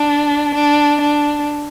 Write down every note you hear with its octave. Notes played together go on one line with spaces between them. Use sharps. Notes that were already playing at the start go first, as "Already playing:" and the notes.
Already playing: D4
D4
D4